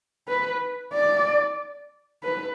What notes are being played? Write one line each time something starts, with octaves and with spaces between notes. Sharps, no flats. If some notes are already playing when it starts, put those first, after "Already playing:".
B4
D5
B4